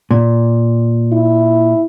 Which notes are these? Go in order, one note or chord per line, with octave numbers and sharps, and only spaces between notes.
A#2
E4